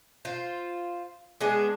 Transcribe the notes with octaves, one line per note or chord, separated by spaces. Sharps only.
F4 C5
G#3 B3 D4 G#4